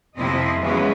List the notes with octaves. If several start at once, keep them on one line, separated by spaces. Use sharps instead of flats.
F2 C3 F3 C4 E4 D#5
C#3 E3 F#3 G#3 B3